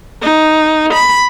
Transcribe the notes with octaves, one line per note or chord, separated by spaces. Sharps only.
D#4
B5